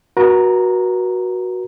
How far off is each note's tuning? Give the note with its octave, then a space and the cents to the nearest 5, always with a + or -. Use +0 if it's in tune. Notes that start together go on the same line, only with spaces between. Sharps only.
F#4 +0 B4 -45 A#5 +0